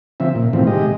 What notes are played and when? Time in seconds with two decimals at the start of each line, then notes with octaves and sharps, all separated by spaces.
0.20 C#3 F3 C4 E5
0.35 A#2
0.53 A2 C3 D#3 E3 C4 F4
0.67 G#3 G4 D#5